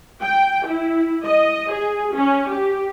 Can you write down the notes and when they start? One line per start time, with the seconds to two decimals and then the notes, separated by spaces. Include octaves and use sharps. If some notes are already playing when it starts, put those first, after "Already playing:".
0.23 G5
0.67 E4
1.27 D#5
1.73 G#4
2.15 C#4
2.51 G4